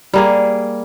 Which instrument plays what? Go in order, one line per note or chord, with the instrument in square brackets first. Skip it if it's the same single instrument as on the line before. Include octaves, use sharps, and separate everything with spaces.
[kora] G3 A#3 G#4